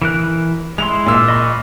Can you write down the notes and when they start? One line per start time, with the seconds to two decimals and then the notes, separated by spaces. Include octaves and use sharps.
0.02 E3 A#4 F#6
0.78 G#3 E4 C6 F7
1.06 A#2 E6
1.28 D#5 B5 C#6